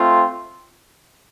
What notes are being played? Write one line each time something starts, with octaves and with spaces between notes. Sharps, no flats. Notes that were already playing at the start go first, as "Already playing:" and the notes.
Already playing: A3 C4 F4